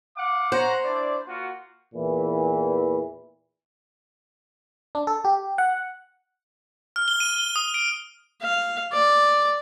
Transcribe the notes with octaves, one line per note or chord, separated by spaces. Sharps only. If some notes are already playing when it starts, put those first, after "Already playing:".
F5 F#5 D6
C5 C#5 F#5 A#5
D4 E4 D5
A#3 F4 F#4
E2 A#2 E3
D4
A4
G4
F#5
F6
G7
D#7
G7
D#6
D7
F5
D5